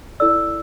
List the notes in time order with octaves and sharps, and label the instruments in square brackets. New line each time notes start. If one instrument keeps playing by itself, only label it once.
[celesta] E4 A4 D5 E6